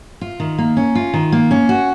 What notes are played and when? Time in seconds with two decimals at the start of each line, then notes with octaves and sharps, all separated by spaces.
0.21 F4
0.40 D#3
0.58 A#3
0.77 C#4
0.95 F4
1.14 D#3
1.32 A#3
1.51 C#4
1.69 F#4